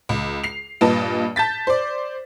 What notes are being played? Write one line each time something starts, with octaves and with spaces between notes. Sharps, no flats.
C#2
C7 F7
G2 A#2 B4 D#5 A5
A5 G6 A6 B6
C5 D5